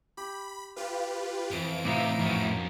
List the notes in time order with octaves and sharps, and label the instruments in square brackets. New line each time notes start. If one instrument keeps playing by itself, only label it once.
[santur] G4 [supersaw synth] B5
[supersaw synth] F4 G4 B4 [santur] F5
[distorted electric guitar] F2 [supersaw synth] E3 D7
[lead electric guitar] A2 E5 [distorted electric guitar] C3 [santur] F3 D#4 D6
[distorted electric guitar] F2 C#4 [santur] F#3 A#4